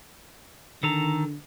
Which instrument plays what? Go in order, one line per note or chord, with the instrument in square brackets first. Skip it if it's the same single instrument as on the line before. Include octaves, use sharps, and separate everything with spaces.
[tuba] D3 [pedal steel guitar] D#3 A4 A#5